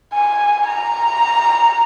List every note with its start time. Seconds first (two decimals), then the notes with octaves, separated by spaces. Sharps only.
0.13 G#5
0.67 A#5